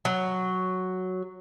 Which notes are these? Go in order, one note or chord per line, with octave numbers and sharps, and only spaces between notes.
F#3